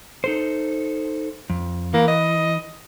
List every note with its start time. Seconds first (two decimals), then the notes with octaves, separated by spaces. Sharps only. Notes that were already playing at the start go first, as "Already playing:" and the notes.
0.24 D#4 A4 C5
1.50 F2
1.94 E3 A#3
2.08 D#5